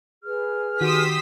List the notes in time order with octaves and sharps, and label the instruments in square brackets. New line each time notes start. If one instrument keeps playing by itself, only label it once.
[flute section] G#4 B4 F6
[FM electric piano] D#3 F#4 [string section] G4 C6 E6 [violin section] D#6 B6